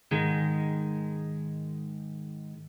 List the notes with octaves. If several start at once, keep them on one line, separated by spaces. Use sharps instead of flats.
G#2 D#3 G#3